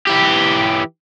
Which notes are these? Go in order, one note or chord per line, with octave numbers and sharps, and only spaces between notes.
E3 G4